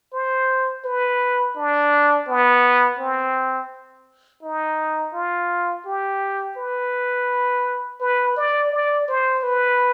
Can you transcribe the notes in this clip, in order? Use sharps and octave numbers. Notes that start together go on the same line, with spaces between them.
C5
B4
D4
B3
C4
D#4
F4
G4
B4
B4
D5
D5
C5
B4